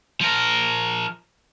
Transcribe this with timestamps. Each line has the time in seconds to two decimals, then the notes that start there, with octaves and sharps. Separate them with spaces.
0.21 F3 A#4